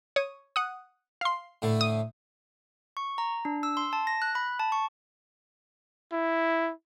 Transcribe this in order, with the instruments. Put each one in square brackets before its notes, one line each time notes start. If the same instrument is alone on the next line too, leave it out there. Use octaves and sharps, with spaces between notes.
[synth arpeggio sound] C#5 D#6
F#5 D#6
F5 C6
[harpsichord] A2 D3 A3
[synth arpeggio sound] D#6
[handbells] C#6
A#5
D4
E6
C6
A5
A#6
F#6
B5
A5
C#6
[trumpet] E4